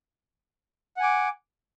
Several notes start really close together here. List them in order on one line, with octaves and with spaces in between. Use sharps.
F#5 G#5 D6